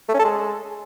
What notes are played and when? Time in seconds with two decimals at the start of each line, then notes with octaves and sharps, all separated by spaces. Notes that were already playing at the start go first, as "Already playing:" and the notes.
0.09 A3
0.14 C#4
0.19 A4
0.24 G#3